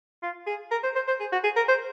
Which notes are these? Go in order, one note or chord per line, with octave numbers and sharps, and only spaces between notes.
F4
G#4
A#4
C5
C5
C5
G#4
F#4
G#4
A#4
C5